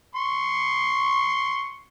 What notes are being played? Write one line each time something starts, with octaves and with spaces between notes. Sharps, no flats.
C6 C#6